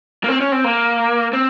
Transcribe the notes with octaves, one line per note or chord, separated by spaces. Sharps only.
A#3
C4
C#4
C4
A#3
C4